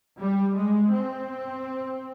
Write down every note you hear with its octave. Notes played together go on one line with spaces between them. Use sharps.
G3
G#3
C4